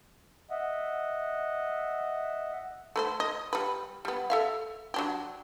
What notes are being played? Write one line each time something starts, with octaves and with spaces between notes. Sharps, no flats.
D#5 E5 F#5
A3 B4 C5
D#5
G3 B4
G3 B3
A4 E5 F5
F#3 D4 G4